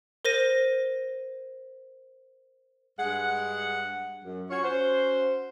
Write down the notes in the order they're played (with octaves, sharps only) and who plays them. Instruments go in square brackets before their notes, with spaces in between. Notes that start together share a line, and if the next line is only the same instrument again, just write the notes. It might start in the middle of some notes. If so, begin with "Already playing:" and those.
[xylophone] A#4 C5 A#6 D#7
[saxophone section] G2 G#3 F#5
F#2
C#4 F4 F#4 C#5
C#4 F#4 C5